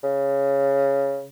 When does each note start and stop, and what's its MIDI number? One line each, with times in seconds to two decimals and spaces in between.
0.04 1.25 49